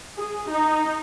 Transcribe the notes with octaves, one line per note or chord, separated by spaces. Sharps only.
G#4
D#4